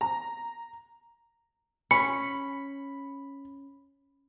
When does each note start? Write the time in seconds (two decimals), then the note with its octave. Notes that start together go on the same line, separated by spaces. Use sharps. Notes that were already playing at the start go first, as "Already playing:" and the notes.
0.01 A#5
1.91 C#4 B5 C#7